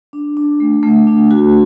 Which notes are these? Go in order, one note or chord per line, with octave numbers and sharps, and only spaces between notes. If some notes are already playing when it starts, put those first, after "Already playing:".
D4
D4
A3
A3
D4
F#4